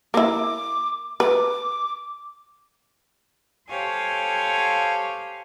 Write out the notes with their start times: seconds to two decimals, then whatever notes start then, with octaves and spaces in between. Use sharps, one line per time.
0.14 A#3 E4 D6
1.20 B4 D6
3.69 G4 A4 C5 C#5 F5 G#5